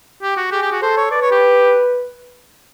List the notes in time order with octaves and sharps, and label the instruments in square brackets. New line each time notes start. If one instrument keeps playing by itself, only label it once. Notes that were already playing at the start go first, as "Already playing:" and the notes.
[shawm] G4
F#4
[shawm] G4 [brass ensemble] G#4
[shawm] G4
F#4
[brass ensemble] A4 [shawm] C5
[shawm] C#5
[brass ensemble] B4 [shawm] D5
[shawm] C#5
G4